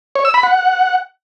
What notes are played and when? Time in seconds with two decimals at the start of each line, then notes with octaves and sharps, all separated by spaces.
0.16 C#5
0.25 E6
0.34 B5
0.43 F#5